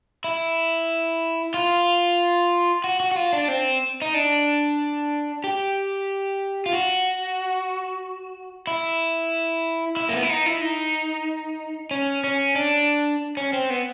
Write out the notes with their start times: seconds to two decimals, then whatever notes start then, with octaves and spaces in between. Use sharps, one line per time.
0.24 E4
1.54 F4
2.84 F#4
3.00 F#4
3.12 F#4
3.16 F4
3.33 D4
3.48 C4
4.02 D#4
4.14 D4
5.44 G4
6.66 F4
6.73 F#4
8.67 E4
9.97 E4
10.09 A#3
10.14 B3
10.23 E4
10.29 D#4
10.46 E4
10.61 D#4
11.91 C#4
12.24 C#4
12.56 D4
13.37 C#4
13.53 C4
13.70 B3